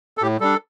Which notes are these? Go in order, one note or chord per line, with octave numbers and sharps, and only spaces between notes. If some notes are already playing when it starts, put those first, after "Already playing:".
A4
A2 G4
G3 D4 A4